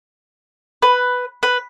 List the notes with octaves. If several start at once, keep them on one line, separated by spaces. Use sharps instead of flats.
B4
B4